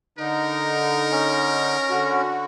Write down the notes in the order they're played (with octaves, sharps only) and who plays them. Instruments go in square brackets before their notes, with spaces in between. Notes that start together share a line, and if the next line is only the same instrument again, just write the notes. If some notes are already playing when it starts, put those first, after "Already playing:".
[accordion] D3 D#4 [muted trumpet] A#4
[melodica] C#4
[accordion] D3 F#4